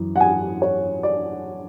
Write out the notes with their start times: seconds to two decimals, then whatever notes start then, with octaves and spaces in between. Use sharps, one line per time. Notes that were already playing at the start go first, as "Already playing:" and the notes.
Already playing: F#2 E3
0.16 F#5
0.20 G#5
0.62 C#5
1.03 D5